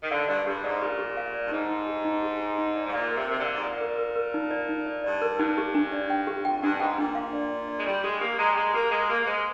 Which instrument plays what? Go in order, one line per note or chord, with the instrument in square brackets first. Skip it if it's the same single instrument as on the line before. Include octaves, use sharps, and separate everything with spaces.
[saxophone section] D#3
[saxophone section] D3 [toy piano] F5
[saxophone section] G2 [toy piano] D5
[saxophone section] G2 [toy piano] G4
[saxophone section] G#2 [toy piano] D5
[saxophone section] A#2 [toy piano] G4
[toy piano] G4
F5
D5
[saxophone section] G2
[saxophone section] G#2 [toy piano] D#4
[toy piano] D#4
G4
D#4
G4
G4
D#4
D5
[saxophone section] G#2
[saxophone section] A#2 [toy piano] F5
[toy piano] A#4
[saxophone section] C3
[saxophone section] C3 [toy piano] A#4
[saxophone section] D3
[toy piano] F5
[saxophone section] G#2
[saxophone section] A#2 [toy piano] F5
[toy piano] A#4
A#4
A#4
D#4
D5
D#4
D5
[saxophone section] G2 [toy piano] D5
[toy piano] A#4
[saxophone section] G2 [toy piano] D#4
[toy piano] G4
D4
D5
G5
G4
[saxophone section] F2 [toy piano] G5
[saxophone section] G2 [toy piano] D4
[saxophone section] G#2 [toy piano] G5
[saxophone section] A#2 [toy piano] D4
[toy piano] F5
D5
D5
D5
[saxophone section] G#3
[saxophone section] G3 [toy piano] G4
[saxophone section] G#3 [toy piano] G4
[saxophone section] A#3 [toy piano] G4
[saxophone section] G#3 [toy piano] A#5
[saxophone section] G3
[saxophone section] G#3 [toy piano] A#5
[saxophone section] A#3 [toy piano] G4
[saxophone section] G#3 [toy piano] A#5
[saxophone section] A#3 [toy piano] G4
[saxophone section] A#3
[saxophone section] G#3 [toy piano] C5